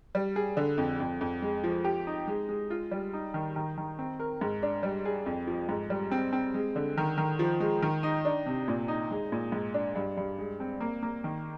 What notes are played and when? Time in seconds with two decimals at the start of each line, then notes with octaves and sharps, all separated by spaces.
0.15 G3
0.36 G#4
0.57 D3
0.78 F2
1.00 F2
1.21 F2
1.42 G#3
1.64 F3
1.84 G4
2.07 D#4
2.28 G#3
2.49 G#3
2.70 F4
2.91 G3
3.14 D#4
3.34 D#3
3.56 D#3
3.77 D#3
3.99 C4
4.20 A#4
4.41 G#2
4.63 D4
4.83 G3
5.05 G#4
5.26 F2
5.47 F3
5.69 G#2
5.90 G3
6.11 C4
6.33 C4
6.54 G#3
6.76 D3
6.97 D#3
7.18 D#3
7.39 F3
7.60 G#3
7.82 D#3
8.03 D#4
8.25 D4
8.46 C3
8.68 A#2
8.88 D#4
9.11 G#3
9.32 A#2
9.52 G#2
9.74 D4
9.96 G2
10.17 G2
10.38 G#3
10.60 C4
10.80 A#3
11.03 A#3
11.24 D#3